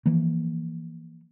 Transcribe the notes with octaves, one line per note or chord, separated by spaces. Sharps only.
E3 F3 A#3